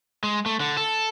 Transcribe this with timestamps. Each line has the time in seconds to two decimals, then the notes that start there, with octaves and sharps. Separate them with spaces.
0.24 G#3
0.46 A3
0.60 D3
0.77 A4